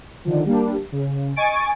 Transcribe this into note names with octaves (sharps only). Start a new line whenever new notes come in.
D3 D#3 F3
G3 A#3 D4
C#3
D#5 G#5 C#6 A6 D7